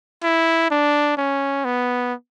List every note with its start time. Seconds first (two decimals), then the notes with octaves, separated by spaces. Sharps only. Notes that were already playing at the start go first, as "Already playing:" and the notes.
0.24 E4
0.71 D4
1.17 C#4
1.65 B3